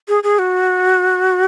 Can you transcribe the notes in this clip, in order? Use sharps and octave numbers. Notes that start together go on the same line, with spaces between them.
G#4
G#4
F#4